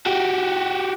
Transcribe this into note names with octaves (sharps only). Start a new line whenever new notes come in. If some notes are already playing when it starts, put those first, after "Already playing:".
F#4 G4